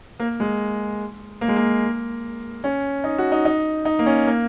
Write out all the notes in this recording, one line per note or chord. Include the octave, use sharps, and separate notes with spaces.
A#3
G#3
A#3
G#3
A#3
C#4
D#4
F#4
D#4
D#4
D#4
A#3
C#4
A#3